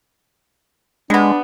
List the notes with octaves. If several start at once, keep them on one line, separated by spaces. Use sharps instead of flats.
G3 G#3 B3 D4